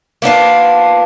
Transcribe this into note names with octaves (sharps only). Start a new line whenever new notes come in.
A#3 B3 D4 F4